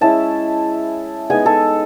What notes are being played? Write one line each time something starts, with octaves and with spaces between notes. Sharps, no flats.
G#3 C#4 E4 A5
G#3 B3 D#4 G#5
A4